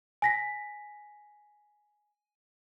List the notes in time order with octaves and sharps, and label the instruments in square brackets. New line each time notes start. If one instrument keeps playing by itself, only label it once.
[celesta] G#5 A#6 B6